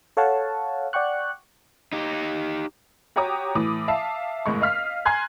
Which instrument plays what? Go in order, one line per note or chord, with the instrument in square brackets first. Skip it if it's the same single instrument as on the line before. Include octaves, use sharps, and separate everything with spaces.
[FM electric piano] A4 C#5 F5 F#5 A5
D5 F#5 G5 C#6 F#6
[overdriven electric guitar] D#4 G4
[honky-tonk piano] F#4 G4 C#5 A#5 D6 D#6
A2 E3 D6 D#6
E5 F5 A5
F#1 A2 G#3 C#6
D#5 F5 F6 B6
G#5 A#5 C6 F#6 G#6